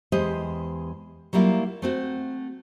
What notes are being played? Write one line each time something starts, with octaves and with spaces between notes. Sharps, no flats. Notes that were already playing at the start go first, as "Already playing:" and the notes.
E2 G#3 G4 C5 D#5
F#3 G3 A#3 E4 F4
A3 C4 F#4